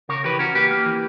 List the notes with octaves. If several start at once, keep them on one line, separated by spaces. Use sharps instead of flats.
C#3 A#4 C#5
E3 G4 B4
C#4 F#4 A#4
A#3 G4 B4
A#3
E3